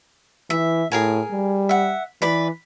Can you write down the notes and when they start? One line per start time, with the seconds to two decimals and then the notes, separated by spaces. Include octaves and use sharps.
0.50 E3 E5
0.92 A2 G#4 A#4 G#5
1.31 G3
1.69 E5 F#5
2.22 E3 B4 D5 B5